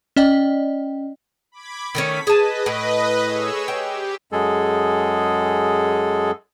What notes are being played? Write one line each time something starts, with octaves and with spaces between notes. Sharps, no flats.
C#4 D5 D#5 G5
B5 D6 G#6
D#3 A3 C#4 B6
G#4 B4 D#5 A5
A2
G#4 C#5 E6
G4 G5
F#2 G#3 G#4 A4